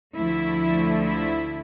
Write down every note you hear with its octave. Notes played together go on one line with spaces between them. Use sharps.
D2 D3 F3 A3 E4
E4